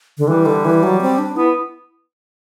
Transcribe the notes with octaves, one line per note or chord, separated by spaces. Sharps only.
D3
E3 G3
D3
E3
F#3
C4
D4
B3 E4